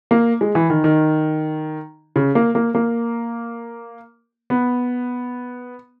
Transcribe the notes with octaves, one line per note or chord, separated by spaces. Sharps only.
A#3
G#3
E3
D#3
D#3
C#3
A#3
A#3
A#3
B3